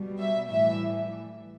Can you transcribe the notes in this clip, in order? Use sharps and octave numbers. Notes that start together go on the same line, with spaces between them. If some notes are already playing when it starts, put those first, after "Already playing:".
Already playing: B2 G3
E5
A2 E3 G3 E5